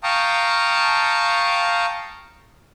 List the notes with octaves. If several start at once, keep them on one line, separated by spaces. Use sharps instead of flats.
F5 G5 A5 A#5 C#6 D#6